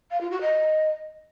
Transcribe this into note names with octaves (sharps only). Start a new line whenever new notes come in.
F5
F4
F#4
D#5